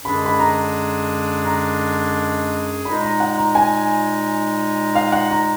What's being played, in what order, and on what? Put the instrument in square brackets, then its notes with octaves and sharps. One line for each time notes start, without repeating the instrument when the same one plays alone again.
[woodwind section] F#2 D3 G#3 D4 G#4 [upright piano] B5
[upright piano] B5
A#5
A#5
[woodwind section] A#2 G#3 D#4 [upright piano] B5
[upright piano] A#5
F#5
A#5
G#5
F5
F#5
A#5